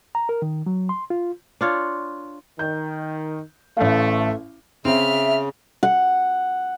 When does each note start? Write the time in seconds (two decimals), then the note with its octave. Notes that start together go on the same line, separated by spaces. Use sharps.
0.15 A#5
0.29 A#4
0.42 D#3
0.66 F#3
0.89 C6
1.10 F4
1.61 D4 F4 C#5
2.59 D#3 G6
3.77 A1 A3 F5
4.85 C#3 C4 E5 F6
5.83 F#5